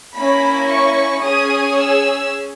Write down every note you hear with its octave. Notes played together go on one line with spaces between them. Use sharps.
A#3 C#4 E4 B5
C#6
C#4 G#4 D#6
E6